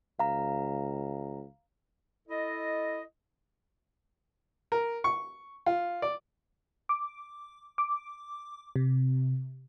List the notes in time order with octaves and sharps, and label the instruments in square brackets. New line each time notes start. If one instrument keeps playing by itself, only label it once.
[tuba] C#2 [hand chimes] F5 A#5
[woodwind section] E4 A4 D#5
[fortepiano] A#4
C#6
F4
D5
[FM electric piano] D6
D6
C3